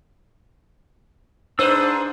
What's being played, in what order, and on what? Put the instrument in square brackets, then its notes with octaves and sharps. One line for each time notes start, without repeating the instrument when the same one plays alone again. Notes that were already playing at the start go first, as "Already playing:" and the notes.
[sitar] G#2 B4 C5 [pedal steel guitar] D4 E6